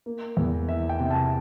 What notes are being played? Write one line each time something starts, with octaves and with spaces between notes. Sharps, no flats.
A#3
E2
E3 E5
G5
C3
A5